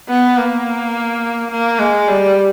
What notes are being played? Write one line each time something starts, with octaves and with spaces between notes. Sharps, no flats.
B3
A#3
A#3
G#3
G3